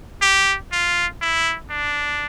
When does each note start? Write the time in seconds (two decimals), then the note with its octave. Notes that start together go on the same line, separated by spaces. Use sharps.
0.22 G4
0.72 F4
1.22 E4
1.70 D4